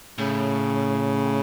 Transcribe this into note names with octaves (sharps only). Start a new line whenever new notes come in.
A2 C#3